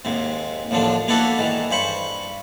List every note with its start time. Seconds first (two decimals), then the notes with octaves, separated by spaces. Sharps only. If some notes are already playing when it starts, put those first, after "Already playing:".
0.05 D#2 G#2 C3
0.71 A1 D#2 D3 F3 D4
1.08 A#3 B3 D4 E4 F#4 A4
1.38 G#2 D#3 E3
1.71 G2 C5 B5 C#6